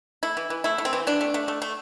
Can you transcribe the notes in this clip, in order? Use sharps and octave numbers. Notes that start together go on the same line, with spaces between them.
A3 E4
E3
E3
A3 E4
A3
C4
E3
E3 D4
A3
A3
A3
A3